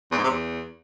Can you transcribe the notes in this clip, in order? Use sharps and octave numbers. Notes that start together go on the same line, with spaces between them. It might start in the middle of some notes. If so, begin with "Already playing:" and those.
E2
G#2
C3
E2